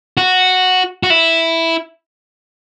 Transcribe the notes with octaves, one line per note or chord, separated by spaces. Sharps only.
F#4
F#4
E4